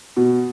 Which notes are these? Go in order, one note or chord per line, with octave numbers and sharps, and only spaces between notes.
B2